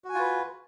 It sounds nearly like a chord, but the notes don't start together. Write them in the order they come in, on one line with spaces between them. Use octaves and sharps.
F#4 G#5 F4 B4